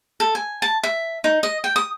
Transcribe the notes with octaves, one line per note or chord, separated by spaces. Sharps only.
A4
G#5
A5
E5
D#4
D#5
G5
D#6